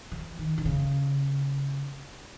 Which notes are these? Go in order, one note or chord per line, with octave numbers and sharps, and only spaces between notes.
F3
D#3
D#3
C#3